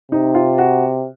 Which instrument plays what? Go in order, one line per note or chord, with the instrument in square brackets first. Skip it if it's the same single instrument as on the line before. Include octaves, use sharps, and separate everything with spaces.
[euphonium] C3 [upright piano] D#4
[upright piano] F4
F#4